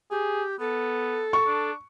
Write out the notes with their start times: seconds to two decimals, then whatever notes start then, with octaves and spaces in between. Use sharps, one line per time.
0.11 G4 G#4
0.60 B3 A4
1.33 C#6
1.47 D4